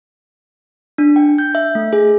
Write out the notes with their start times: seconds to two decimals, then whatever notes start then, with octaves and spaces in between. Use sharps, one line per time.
0.98 D4
1.16 G5
1.38 G6
1.55 E5
1.75 A3
1.93 G#4